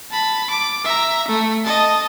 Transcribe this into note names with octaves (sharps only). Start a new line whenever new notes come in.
A5 B5
D6
E5 A#5
A3
D#5 A5